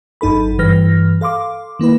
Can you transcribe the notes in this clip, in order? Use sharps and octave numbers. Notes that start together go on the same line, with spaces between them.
G#1 F#2 D#4 A4 B5
G2 E3 B4 F6 A#6
A4 F5 C6 D6
D#3 A#3 E4 B4